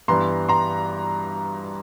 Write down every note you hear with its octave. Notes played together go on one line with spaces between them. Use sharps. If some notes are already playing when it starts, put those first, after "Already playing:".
G2 E3 G3 B3 A#5 C6
A#5 C6